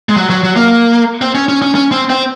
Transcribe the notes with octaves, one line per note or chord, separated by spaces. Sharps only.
G#3
F#3
F#3
F#3
A#3
C4
C#4
C#4
C#4
C#4
C4
C4